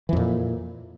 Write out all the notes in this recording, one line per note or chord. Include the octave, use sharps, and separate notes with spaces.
F2 A#2 E3